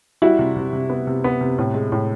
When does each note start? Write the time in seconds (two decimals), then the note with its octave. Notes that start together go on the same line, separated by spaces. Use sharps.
0.22 G3 E4 F#4
0.39 C3
0.56 C3
0.73 C3
0.90 B3
1.07 C3
1.24 B3
1.41 C3
1.58 A2
1.74 G#3
1.92 A2